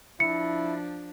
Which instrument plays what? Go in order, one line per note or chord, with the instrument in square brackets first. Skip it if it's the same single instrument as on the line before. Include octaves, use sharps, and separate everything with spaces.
[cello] F3 D4 [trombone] E4 [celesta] C#7